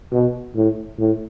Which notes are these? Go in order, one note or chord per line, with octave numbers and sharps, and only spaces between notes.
B2
A2
A2